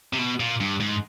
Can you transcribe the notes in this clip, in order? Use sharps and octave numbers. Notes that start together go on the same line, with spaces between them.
C3
B2
A#2
G2
G#2